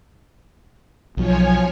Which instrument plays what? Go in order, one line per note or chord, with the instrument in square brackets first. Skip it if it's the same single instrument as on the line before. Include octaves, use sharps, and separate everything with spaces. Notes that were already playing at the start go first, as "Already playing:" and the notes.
[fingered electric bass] B1 F#3 [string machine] F3 C#5 G#5